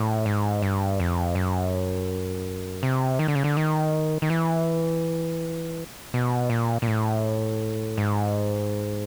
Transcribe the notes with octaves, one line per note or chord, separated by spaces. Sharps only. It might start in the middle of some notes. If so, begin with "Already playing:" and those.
Already playing: A2
G#2
G2
F2
F#2
C3
D#3
D3
C#3
D3
D#3
D#3
E3
B2
A#2
A#2
A2
G#2